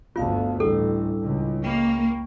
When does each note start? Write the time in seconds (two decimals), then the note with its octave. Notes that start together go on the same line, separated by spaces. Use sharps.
0.16 G1 D2 B3 F4 F5 A5
0.60 A1 G3 D4 E4 A4
1.22 C#2
1.64 A#3 G5 B5 C#6